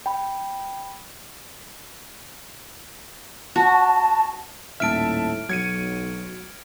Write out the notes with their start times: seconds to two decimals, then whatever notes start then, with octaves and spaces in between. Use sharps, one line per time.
0.06 G5 B5
3.56 F#4 A5
4.80 D#1 A2 E5 A5 F6 D7
5.49 B1 F#3 G#6 C#7 D#7